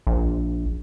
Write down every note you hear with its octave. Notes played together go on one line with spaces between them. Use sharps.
A#1